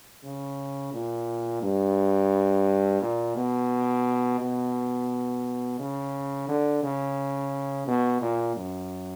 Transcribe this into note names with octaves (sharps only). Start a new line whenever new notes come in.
C#3
A#2
G2
A#2
B2
B2
C#3
D3
C#3
B2
A#2
F#2